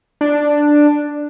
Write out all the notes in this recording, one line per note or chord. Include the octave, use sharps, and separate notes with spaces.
D4